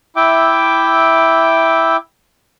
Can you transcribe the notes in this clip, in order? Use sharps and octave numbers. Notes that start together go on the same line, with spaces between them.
E4 E5 G5 D6